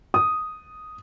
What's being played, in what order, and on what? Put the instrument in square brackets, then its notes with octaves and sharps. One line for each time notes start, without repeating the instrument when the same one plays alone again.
[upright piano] D#6